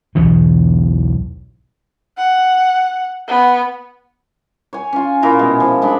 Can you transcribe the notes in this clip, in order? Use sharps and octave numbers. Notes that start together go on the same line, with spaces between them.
B1 E2 G#2 B2
F#5
B3
C#5 G#5
C#4 F4
A#2 E4 F4 A#5
B2 G#3
F3
G#3 D4 B5